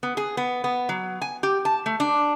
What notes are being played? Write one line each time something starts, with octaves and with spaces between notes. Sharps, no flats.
B3
G#4
B3
B3
F#3
G#5
G4
A5
A3
D4